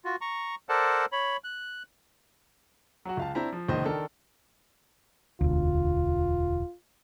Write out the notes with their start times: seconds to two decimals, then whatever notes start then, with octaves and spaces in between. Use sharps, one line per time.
0.05 F4 F#4
0.21 A#5 C#6
0.69 A4 A#4 C5 D5 F#5 A5
1.12 C#5 B5
1.44 F#6
3.05 F#3 F#4
3.17 C#2 F5 A5
3.35 C4 D4 E4 C5 A5 A#5
3.53 F3
3.68 E1 C#2 A#2 D#3 C5 D#5
3.85 D#3 D4 A4 A#4
5.41 E1 D2 F4